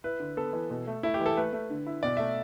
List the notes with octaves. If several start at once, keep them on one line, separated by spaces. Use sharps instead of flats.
E4 B4
D3
B3 A4
E3
B2
A3
A3 E4
G4
E3
A4
A3 B4
A3
D3
E4
B1 D5
A3 E5